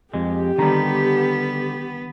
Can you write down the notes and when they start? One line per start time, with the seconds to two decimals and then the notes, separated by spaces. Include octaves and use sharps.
0.14 F2 G#3 G4
0.58 D3 D#3 G3 B3 A#5